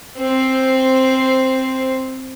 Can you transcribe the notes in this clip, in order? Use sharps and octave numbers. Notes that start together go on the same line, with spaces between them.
C4 C5